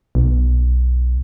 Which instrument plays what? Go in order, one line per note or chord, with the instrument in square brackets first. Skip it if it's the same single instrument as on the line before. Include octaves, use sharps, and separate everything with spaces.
[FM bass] B1